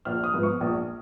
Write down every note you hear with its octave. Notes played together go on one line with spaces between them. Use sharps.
A#1 F6
D#6
G#2 F3 B3
C#6
A#1 D#6